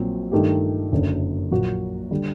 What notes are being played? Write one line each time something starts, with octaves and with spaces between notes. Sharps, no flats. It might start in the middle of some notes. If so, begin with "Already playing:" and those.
Already playing: A#1 A#2 F#3 C4
G2 D#3 A3 D#4 G4
F#1 F#2 D3
A#1 A#2 F#3 A#3 F#4
D3 G3